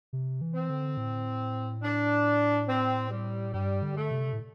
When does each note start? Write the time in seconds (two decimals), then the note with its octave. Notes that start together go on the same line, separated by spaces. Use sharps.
0.13 C3
0.41 E3
0.55 C4
0.70 D3
0.97 A2
1.83 D4
2.68 C4
3.11 G3
3.54 G2 G3
3.82 D3
3.96 A3
4.11 C3
4.33 A2